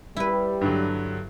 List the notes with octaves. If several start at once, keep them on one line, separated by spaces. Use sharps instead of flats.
G3 E4 B4
G2 D3 F#3